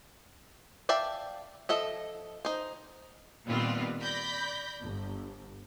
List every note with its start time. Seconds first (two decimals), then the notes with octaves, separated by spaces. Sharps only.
0.89 D5 E5 F5 G5 A5
1.69 F3 A4 D#5 E5
2.45 D#4 C5
3.46 A#2 D#3 G3 B3 C4 F4
4.02 D5 B5 G6 A#6 B6
4.82 G1